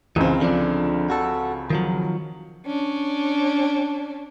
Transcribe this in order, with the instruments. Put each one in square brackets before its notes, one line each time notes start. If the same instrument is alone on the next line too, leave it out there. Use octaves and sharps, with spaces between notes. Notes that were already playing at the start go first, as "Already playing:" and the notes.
[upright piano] C#2 C#3 C4 [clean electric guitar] E3
[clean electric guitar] D3 F3 D4
F#4 A4
D#3 F3 F#3
[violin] C#4 D4